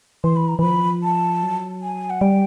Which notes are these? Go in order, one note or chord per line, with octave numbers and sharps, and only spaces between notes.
E3 C6
B5
A#5
E3 F3 B5
A5
F#3
G#5
F#5
G3 G5